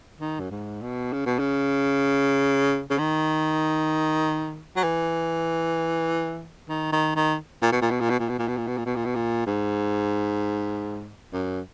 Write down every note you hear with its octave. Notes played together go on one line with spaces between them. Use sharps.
D#3
F#2
G#2
B2
C#3
B2
C#3
C#3
D#3
F#3
E3
D#3
D#3
D#3
A#2
B2
A#2
B2
A#2
B2
A#2
B2
A#2
B2
A#2
B2
A#2
B2
A#2
B2
A#2
G#2
F#2